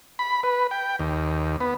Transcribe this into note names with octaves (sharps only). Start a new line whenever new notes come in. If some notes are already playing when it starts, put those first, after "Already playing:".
B5
B4
G5
D#2
B3